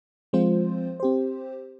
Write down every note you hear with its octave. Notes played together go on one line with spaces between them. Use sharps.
F3 G#3 C4 F4 C5
C4 G4 C5